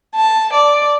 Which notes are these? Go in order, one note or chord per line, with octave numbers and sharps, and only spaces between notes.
A5
D5